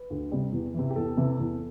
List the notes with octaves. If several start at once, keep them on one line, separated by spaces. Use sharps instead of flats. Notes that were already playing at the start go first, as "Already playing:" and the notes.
Already playing: B4
D2
C3 G3
E2
C3 E3
G4
E2 A4
C3 E3
E2